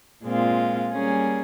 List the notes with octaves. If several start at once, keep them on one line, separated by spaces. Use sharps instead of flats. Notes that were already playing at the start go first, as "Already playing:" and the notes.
A#2 G#3 C4 F4
G3 A#3 C#4 G#4